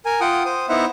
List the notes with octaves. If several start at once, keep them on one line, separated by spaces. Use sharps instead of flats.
A#4 G#5
F4 F#5 G5 D#6
C5 D#6
B3 D#4 E4 C5 E5 F#5